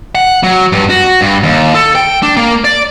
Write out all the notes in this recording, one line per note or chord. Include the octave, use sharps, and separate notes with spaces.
F#5
F#3
G2
F#4
G2
D#2
A4
G5
D4
A#3
D5